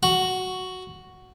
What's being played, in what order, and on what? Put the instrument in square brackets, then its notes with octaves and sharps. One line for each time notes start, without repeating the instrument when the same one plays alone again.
[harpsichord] F#4